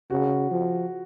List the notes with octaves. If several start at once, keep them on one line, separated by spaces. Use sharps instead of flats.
C#3 F#4
F3